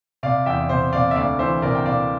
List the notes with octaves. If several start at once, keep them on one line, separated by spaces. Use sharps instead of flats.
C3 D5 F5
E2 E5 G5
C3 C5 E5
C3 D5 F5
E5
D2 D5 F5
E3 C5 E5
C3 A#4 D5
G5
C3 D5 F5